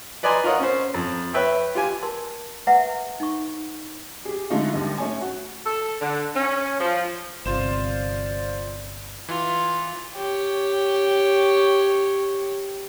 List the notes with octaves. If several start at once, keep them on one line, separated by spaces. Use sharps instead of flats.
B4 D5 D#5 G#5 A#5 C6
F4 A#4 C#5 D#5 F#5
C#4 C5
F2
B4 C#5 E5 G5
F4 G4 G#5
A#4 A5 C6
B4 E5 F#5 A#5
D#4 C#6
G4 G#4
D3 G#3 A3 D#4 F4
D#2 G#2 D3 G3 D#5
A3 C#4 G#5
F#4
A4
D3
C#4
F3
G1 C3 F4 C5 D5 E7
E3 F4
G4 C#5